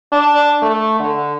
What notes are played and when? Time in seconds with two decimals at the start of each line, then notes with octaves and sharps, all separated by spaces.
0.12 D4
0.62 A3
1.00 D3